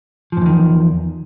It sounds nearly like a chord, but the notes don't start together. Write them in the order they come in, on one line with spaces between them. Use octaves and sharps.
F3 G#2 E2 D#3